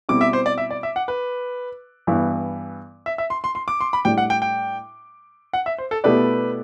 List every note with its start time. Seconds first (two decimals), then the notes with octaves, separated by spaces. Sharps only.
0.09 B2 G3 C4 E4 D6
0.21 E5
0.33 C5
0.46 D5
0.58 E5
0.71 D5
0.83 E5
0.96 F#5
1.08 B4
2.07 G2 E3 B3
3.06 E5
3.18 E5
3.30 C6
3.44 C6
3.55 C6
3.68 D6
3.81 C6
3.93 B5
4.05 A2 G3 D4 G5
4.18 F#5
4.30 G5
4.42 G5
5.53 F#5
5.66 E5
5.78 C5
5.91 A4
6.04 B2 A3 E4 G4 B4 D5